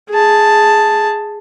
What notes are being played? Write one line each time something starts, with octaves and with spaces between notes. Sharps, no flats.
G#4 A5